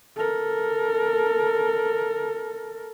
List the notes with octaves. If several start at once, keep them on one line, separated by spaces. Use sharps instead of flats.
A4 A#4